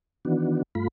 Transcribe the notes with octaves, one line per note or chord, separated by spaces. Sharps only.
D#3 E3 B3 D4 F#4
G2 A3 F4 B5